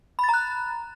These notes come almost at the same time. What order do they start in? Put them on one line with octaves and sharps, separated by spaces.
B5 A6 A#5 F#6